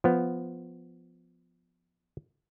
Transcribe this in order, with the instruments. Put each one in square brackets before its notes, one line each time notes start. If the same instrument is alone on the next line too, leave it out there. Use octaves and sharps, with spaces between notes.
[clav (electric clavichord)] F3 B3